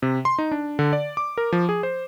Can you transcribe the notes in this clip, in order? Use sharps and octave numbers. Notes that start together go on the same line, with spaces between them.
C3
C6
D#4
D4
D3
D5
D6
A#4
F3
G#4
C5